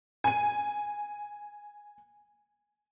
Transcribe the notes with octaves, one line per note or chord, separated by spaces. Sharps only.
G#5 D#7